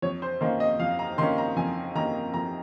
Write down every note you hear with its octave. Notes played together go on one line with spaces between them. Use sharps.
F2 C#5
C5
D#3 A#3 C#4 C5
D#5
F2 F5
A#5
D#3 A#3 C#4 C6
A#5
F2 G#5
D#3 A#3 C#4 A#5
F2 A#5